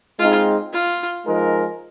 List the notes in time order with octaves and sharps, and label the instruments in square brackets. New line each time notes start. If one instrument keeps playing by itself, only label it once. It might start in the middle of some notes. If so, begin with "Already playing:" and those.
[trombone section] G#3 C4 D#4 G#4 [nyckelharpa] F4
[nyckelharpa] F4
[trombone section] F3 G#3 D#4 A#4